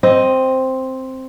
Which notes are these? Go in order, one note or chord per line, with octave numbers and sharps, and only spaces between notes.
C4 D#5